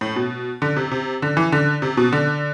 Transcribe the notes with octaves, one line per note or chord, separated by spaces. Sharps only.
A2
B2
D3
C3
C3
D3
E3
D3
C3
B2
D3